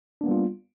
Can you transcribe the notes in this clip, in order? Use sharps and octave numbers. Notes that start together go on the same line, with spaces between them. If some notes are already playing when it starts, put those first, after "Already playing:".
G3 A#3 B3 D4 F4